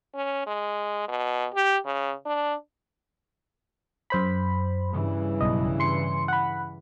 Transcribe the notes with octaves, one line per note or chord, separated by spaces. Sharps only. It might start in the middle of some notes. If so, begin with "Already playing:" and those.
C#4
G#3
B2
G4
C#3
D4
F#2 C5 B5
G2 C#3 E3
B1 D#5
C6 C#7
F#5 B5